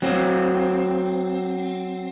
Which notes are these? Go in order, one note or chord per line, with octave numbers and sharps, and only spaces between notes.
F#3 C4